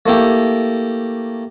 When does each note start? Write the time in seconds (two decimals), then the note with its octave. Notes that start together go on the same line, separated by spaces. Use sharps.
0.06 A3 A#3 E4 G4